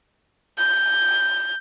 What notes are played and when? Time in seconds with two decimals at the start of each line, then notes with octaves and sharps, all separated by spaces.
0.58 G6